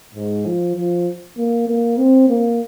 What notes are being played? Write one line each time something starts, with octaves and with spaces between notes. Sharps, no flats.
G#2
F3
F3
A#3
A#3
C4
A#3